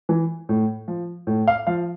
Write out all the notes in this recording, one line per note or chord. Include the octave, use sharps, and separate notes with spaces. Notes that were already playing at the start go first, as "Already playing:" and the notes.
E3
A2
F3
A2
F5
F3 F5